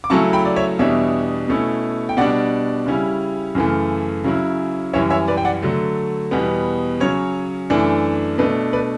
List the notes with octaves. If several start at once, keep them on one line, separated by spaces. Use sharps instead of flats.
D6
C#3 F#3 A3 C#4 E4 A5 C#6
G5 B5
D5
C#5 E5
E2 B2 G3 D4 C#5 E5
B2 A3 C#4 E4
G5
B2 G3 D4 D5 F#5
C#3 G3 C#4 E4
F#2 C#3 E3 A3
C#3 F#3 C#4 E4
F#2 E3 G3 C#4 C#5 E5
C#5 E5
B4 D5
G5
D5 F#5
D3 F#3 A3
E2 B2 G3 B3
C#3 F#3 C#4 C#5
F#2 E3 A3 D4
B2 A3 D4 B4
B4 D5